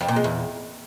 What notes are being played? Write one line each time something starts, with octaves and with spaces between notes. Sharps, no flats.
F2
A#2
G#3
E2